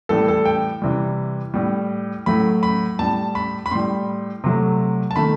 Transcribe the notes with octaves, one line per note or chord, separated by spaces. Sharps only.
A2 E3 G3 A4
A4
G5
C3 E3 G3
A2 G3
A2 F#3 A3 B5
B5
A2 G3 A5
B5
B5
A2 G3 C6
C3 F#3 A3
A5
D#3 A3 B5